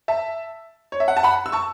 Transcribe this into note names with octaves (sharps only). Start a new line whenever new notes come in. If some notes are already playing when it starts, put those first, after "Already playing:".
E5 A5
C#5
E5
F#5
A5
F#5 B5
E6
A5 C#6